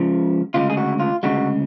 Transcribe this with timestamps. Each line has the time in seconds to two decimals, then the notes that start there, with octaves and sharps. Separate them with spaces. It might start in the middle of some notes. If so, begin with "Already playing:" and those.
Already playing: C#2 C#3 F3
0.54 D2 C#3 G#3 F4
0.70 G#4
0.77 F#4
1.00 F4
1.23 D2 C#3 G#3 F#4